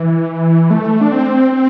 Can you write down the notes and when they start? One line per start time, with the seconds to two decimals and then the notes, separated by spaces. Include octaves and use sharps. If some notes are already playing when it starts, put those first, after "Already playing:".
Already playing: E3
0.71 A3
1.01 D4
1.12 C4
1.52 C4